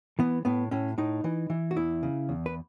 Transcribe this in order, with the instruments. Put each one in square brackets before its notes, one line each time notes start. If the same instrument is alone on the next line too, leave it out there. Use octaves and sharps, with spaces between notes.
[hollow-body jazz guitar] E3 B3
A2 B3
A2 C#4
A2 D#4
E3
E3
F#4
E2 E4
C#3
E2
B4